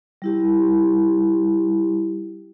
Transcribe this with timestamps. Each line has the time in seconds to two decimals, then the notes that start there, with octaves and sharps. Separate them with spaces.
0.22 G3 E4 G4